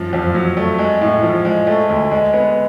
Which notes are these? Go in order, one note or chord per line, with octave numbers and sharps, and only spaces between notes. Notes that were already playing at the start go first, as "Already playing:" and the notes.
Already playing: F#2 F3
F2
F#3
A3
G#3
A2
F3
G#3
A3
D2
G#3
B3